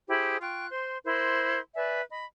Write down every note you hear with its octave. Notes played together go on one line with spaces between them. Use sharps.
E4 G4 G#4 C5
F4 G5 C#6 F#6
C5 C6
E4 A#4 C5 C6
B4 D5 E5 G#5
D#5 B5